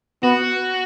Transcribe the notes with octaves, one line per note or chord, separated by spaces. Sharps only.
B3 F#4